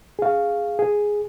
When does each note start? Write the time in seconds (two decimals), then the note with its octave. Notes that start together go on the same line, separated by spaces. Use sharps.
0.19 G#4 F5
0.79 G#4